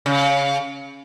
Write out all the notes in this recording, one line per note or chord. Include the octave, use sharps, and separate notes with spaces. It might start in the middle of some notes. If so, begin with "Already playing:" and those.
C#3